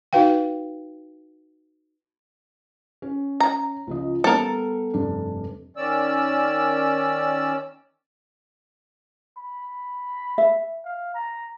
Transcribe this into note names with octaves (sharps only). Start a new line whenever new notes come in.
D#4 F#4 B4 F5 G5
C#4
A#5
C#2 F3 D#5
G3 B3 A4 A#4
F1 G2 D4
D#3 C#4 D5 E6
B5
E5
F5
A#5